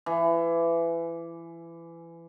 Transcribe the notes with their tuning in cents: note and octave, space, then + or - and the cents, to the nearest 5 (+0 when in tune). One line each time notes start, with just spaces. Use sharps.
E3 +25